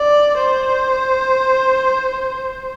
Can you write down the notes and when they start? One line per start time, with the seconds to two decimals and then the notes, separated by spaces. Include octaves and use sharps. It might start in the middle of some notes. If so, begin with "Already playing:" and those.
Already playing: D5
0.38 C5